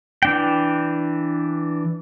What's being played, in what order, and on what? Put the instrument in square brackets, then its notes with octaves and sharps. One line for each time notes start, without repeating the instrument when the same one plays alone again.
[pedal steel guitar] E3 D4 G5